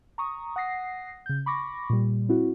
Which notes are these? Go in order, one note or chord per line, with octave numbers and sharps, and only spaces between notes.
A#5 C#6 D#6
F#5 D#6 A#6 C7
C#3 G6
B5 C#6 D6 A#6
A#2 G3
C4 E4 F#4